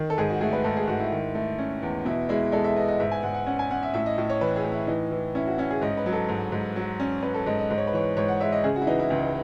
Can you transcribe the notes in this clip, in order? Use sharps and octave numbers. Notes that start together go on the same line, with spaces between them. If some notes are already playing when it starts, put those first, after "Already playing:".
Already playing: D#3
A4
G#2 G#4
F#4
A3 G#4
B4
G#2 A4
G#4
G#2 F#4
E4
D#3
A3
C#4
E2
B2 E4
G#3 E4
G#3 A4
E5
B3 D#5
D#5
G#2 E5
G#5
G#2 F#5
F#5
C#4 F#5
G#5
C#4 F#5
E5
A2 E5
D#5
A2
C#5
E3 B4
G#4
A2
E4
E3 D#4
E3
C#4 E4
F#4
C#4 E4
G#4
G#2 D#5
B4
F#3
A4
G#2
G#2
F#3
C#4
C#4 B4
A4
G#2 D#5
D#5
G#2 D#5
C#5
B4
E3 C#5
G#2 C#5
F#5
G#3 E5
D#5
C#3 G#4
F#4
E4
E3 D#4
E4
C#2